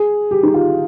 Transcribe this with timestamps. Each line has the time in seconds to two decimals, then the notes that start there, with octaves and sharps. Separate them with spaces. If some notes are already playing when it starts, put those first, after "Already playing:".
Already playing: G#4
0.31 G4
0.43 D#4
0.54 F4